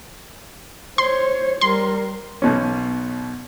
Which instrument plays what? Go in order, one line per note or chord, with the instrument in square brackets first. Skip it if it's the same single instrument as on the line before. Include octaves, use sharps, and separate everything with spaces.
[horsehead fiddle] C5 C#5 [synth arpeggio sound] C6
[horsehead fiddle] G3 A#4 [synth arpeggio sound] C6
[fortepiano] B1 B2 C#4